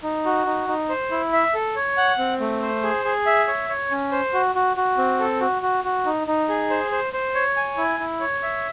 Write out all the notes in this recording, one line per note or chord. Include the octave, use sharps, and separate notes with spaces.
D#4
F#4
D#4
D#4
C5
E4
E5
A4
C#5
F#5
C4
A3
C5
G#4
G#4
E5
C#5
C#5
C#4
C5
F#4
F#4
F#4
C4
A4
F#4
F#4
F#4
D#4
D#4
G#4
C5
C5
C5
C#5
G#5
E4
E4
C#5
E5